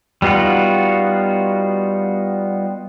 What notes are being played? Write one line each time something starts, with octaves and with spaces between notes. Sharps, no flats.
G3 B3 D#4 F4 F#4